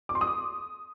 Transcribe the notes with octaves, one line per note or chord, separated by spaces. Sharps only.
D6
C6
D#6
D6